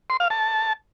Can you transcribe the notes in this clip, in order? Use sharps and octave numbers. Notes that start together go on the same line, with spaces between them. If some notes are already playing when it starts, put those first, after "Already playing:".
C6
F5
A5